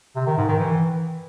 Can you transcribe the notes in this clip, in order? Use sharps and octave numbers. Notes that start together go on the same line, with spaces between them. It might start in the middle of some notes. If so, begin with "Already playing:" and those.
C3
D#3
G#2
D#3
E3